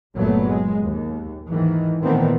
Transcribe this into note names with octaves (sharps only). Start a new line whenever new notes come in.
G1 A#2 F#3 A3 B3
G#3
D#2
G#2 D#3 E3
A#2 D#3 E3 A3 B3 C4